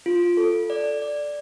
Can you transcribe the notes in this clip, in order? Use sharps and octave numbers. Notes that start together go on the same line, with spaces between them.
F4
A4
D5
D5